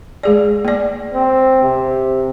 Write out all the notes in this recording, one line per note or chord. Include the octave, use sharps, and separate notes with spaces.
G#3 G#4 D5
A#3 D5
C4
C3